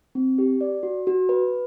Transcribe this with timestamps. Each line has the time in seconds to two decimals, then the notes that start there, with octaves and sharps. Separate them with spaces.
0.15 C4
0.38 G4
0.61 D5
0.83 F#4
1.07 F#4
1.29 B4